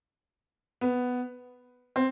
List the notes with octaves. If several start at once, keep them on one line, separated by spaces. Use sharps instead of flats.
B3
C4